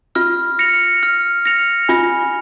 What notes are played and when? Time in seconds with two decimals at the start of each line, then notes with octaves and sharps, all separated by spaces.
0.15 F4 F6
0.59 A#6 C#7 F7
1.03 F6
1.46 A#6 C#7 F7
1.89 F4 G#5